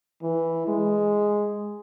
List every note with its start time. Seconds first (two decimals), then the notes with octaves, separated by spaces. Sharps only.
0.22 E3
0.67 G#3